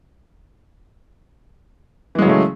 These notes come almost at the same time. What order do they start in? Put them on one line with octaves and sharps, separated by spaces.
E3 G#3 F#3 C#3 A3